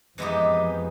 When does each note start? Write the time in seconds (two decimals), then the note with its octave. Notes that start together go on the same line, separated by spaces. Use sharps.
0.18 F2 E3 F3 G#3 B3 D#4 G4